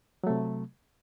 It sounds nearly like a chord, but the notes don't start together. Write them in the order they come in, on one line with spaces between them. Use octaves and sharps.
F#3 A3 C3